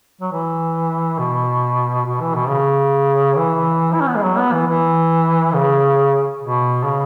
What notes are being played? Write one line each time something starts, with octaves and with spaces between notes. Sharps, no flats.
F#3
E3
B2
B2
E3
B2
C#3
E3
E4
C#4
B3
G#3
F#3
B3
E3
E3
C#3
B2
C#3